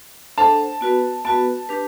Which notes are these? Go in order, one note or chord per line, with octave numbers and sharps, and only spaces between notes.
D4 A4 C5 F#5 A5
B3 F#4 B4
B3 F#4 B4 A5
D4 G4 B4